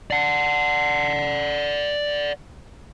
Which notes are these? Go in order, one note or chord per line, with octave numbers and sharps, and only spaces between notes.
D5 F#5